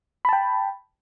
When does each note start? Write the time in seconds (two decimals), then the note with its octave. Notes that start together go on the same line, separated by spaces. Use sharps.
0.25 B5
0.29 A5
0.33 G5